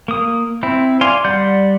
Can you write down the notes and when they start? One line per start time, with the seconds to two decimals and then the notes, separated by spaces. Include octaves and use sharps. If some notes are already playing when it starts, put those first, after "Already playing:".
0.08 A#3 D#6
0.63 C4 E4
1.01 D5 F5 G#5 C6
1.25 G3 D5 F#5 C6 G6